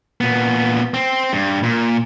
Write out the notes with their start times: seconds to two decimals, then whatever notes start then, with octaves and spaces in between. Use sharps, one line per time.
0.21 A#2 B3
0.94 C4
1.33 G2
1.63 A#2